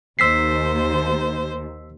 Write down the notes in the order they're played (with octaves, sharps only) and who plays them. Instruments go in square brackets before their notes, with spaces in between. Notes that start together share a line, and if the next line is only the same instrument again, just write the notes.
[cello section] D#2 [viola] C5 [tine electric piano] E6 B6 C7